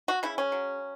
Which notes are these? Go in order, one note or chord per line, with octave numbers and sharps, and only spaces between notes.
F#4
C#3 E4
C#4
F#3